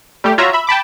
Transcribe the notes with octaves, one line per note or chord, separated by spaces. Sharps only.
G3 A3 G4
F4 F#4 C#5 E5 A#5
E5 B5
G5 A5 B5 D6